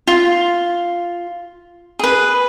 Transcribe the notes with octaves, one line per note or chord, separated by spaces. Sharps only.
F4
G#4 B4